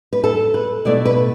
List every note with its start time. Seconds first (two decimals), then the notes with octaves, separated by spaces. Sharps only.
0.13 B4
0.24 A4
0.54 B4
0.85 B2 A3 E4 D5
1.05 B4